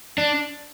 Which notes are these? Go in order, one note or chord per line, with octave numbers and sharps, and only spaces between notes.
D4